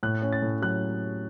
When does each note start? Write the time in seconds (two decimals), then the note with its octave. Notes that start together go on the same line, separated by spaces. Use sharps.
0.03 A2 F#6
0.22 C#4
0.32 A6
0.42 A2
0.62 F#3 F#6